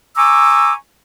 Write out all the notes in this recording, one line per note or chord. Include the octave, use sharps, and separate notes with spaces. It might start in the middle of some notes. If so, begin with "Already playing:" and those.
G#5 A#5 C#6 D6 E6